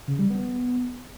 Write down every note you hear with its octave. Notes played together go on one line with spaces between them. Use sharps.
C#3
G3
B3